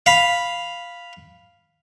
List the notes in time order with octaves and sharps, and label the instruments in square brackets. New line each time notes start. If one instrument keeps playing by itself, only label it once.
[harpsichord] F5 B5